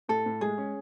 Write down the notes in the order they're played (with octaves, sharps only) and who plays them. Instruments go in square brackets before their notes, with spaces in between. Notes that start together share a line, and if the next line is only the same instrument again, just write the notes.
[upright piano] A2 [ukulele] A4
[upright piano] A2
[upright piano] G#3 [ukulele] G#4
[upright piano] C#4